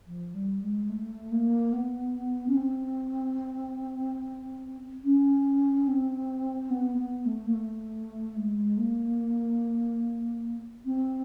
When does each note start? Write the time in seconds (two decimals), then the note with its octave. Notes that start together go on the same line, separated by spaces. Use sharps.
0.07 F3
0.34 G3
0.62 G#3
0.90 A3
1.32 A#3
1.73 B3
2.48 C#4
2.56 C4
5.04 C#4
5.88 C4
6.70 B3
6.98 B3
7.26 A3
7.46 A#3
7.53 A3
8.37 G#3
8.78 A#3
10.85 C4